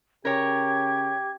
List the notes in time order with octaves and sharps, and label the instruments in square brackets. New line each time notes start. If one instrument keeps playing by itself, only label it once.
[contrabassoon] C#3 [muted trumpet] G4 [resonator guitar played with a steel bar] A#4 C#5 [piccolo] G#6